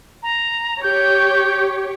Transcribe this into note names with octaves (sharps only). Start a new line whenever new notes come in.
A#5
G4 C#5 G6